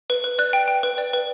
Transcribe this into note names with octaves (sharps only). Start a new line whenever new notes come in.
B4
B4
D5 F#6
G5
G5
B4
D5
B4